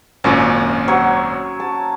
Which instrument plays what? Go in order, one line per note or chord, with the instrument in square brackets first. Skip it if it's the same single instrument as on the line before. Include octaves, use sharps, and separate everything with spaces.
[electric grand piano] G#1 F#2 A#2 [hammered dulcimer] C#4
[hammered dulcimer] F#3 C#5
A5